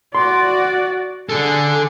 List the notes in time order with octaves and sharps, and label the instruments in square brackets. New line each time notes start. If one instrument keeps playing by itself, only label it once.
[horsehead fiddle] F#4 D5 [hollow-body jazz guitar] C6
[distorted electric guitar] D3 A4 [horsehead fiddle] G#4